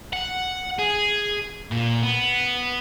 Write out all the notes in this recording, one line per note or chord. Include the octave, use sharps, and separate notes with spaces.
F#5
G#4
A#2
B3